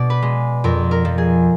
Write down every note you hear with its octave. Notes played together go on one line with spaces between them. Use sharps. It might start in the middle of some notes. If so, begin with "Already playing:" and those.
Already playing: B2 D5
B4
G#3
F2 A#4
A#4
F3
G#4